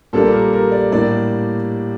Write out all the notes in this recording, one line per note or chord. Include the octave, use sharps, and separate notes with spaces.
A#2 G3 A#3 D4 A4
A#4
A#4
D5
A2 G3 A#3 D4 D5